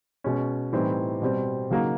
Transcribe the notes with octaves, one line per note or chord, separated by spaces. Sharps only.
B2 G#3 C#4
A2 E3 G3 C4 D#4
B2 G3 C4
C#3 F#3 A#3 D#4 F#4